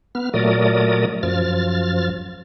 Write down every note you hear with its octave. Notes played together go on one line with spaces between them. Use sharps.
B3 F6
A#2 F#3 A3 A#4 D5 D#6
F#2 F3 F6 A6